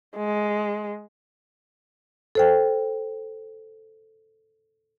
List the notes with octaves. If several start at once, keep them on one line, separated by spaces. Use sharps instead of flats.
G#3
A4 C5 G5